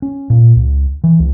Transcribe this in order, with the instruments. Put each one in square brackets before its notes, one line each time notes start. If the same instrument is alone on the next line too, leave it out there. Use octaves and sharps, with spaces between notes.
[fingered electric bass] C#4
A#2
C#2
E3
C#2